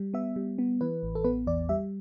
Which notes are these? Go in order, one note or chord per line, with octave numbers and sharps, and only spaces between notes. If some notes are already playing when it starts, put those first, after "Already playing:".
Already playing: G3
B3 E5
G3
B3
E3 B4
A1
A4
B3 B4
E2 D5
G3 E5